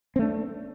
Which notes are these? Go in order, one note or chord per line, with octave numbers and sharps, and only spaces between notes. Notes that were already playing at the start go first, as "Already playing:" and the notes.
A3 C4 D4